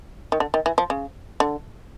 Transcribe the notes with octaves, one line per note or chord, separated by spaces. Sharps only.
D#3
D3
D#3
E3
F3
C#3
D3